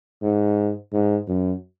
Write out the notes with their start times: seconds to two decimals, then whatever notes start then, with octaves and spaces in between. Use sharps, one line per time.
0.23 G#2
0.93 G#2
1.28 F#2